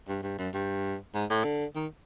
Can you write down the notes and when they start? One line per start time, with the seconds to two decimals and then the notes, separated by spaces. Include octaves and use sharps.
0.09 G2
0.23 G2
0.38 F#2
0.54 G2
1.14 G#2
1.30 A2
1.44 D3
1.76 D#3